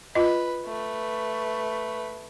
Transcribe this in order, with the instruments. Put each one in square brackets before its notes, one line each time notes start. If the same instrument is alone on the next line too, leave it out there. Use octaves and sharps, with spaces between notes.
[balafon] F4 D#5 [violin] B4
[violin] A3 B4